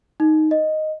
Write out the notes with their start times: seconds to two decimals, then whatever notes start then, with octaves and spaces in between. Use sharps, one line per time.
0.20 D#4
0.51 D#5